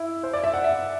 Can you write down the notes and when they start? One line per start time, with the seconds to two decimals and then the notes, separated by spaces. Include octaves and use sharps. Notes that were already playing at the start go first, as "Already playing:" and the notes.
Already playing: E4
0.23 C5
0.33 D5
0.44 E5
0.54 F#5
0.64 E5